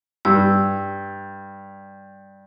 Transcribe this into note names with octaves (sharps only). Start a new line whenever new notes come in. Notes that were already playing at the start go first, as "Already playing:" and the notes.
G2 E6